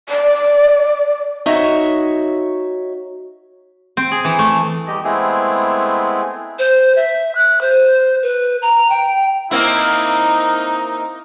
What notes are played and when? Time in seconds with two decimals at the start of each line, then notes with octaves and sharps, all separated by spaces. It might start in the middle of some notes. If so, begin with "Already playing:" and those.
0.09 D5
1.46 D#4 F#4 C#5 E5
3.97 C4
4.11 G#4
4.24 E3
4.39 A3
4.87 E2 G3 G4 D#5
5.04 G#3 A3 B3 C4 E4 G#4
6.59 C5
6.95 E5
7.35 F#6
7.61 C5
8.22 B4
8.62 A#5
8.89 G5
9.51 A#3 C4 D#4 E4